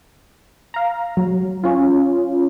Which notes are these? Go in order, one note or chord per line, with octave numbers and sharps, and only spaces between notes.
F5 A#5
F#3
C#4 F4